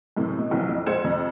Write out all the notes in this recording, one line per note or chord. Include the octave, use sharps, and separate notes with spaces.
F#2 A2 C3 E3
B2
A#1 C3 E3 F#3
F2
A#1 G#3 C5 G#6 C#7 E7
F2 C3